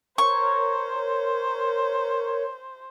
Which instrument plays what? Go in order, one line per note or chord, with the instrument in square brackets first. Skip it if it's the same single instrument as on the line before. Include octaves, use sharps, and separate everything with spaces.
[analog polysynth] A#4 C#5 [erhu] C5 [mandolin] C#6